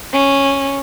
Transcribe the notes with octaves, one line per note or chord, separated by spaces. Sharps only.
C#4